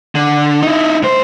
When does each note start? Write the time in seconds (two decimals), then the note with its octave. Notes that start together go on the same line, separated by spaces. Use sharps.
0.15 D3
0.63 D#4 E4
1.03 A2 C5